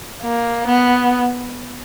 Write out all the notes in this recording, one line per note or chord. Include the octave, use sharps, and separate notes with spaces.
A#3
B3